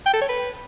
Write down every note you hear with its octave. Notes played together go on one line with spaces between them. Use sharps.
G5
A4
C#5
B4